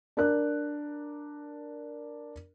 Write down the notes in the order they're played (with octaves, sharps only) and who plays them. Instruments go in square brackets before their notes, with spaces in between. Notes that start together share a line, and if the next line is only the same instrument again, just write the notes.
[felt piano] D4 A#4 F#6